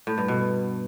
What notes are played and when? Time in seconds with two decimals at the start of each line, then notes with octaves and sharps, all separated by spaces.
0.07 A2
0.18 G2
0.28 B2